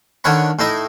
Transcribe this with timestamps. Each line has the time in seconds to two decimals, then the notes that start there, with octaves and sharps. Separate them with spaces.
0.24 D3 D#3 C#5 F#5 B5
0.59 A2 D#4 E4 D#5